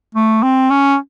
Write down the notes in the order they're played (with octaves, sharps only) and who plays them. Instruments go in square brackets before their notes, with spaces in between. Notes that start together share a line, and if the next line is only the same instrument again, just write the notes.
[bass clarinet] A3
C4
C#4